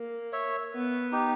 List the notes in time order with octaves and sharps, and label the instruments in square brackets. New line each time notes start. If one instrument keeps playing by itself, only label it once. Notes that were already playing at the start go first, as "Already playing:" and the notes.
Already playing: [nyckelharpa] A#3
[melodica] C#5 E5
[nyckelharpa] B3
[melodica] D#4 G4